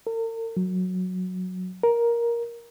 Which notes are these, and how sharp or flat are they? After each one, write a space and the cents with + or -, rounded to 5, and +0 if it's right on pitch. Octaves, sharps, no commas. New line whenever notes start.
A#4 -45
F#3 -10
A#4 +10